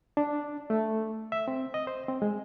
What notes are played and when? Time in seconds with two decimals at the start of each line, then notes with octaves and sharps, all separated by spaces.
0.17 D4
0.70 A3
1.32 E5
1.48 C4
1.74 D#5
1.87 C5
2.09 C4
2.22 G#3